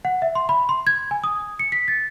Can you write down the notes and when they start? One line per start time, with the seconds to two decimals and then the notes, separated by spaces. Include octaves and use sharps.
0.05 F#5
0.22 E5
0.35 C6
0.49 B5
0.69 C6
0.87 G#6
1.11 G#5
1.24 D#6
1.59 C#7
1.72 B6
1.88 A6